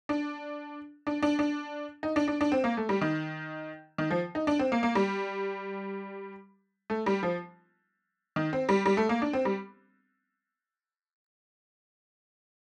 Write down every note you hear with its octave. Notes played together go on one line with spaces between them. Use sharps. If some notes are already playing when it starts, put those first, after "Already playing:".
D4
D4
D4
D4
D#4
D4
D4
D4
C4
A#3
A3
G3
D#3
D#3
F3
D#4
D4
C4
A#3
A#3
G3
A3
G3
F3
D#3
C4
G3
G3
A3
A#3
D4
C4
G3